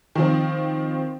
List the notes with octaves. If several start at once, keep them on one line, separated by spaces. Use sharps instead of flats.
D#3 F3 C4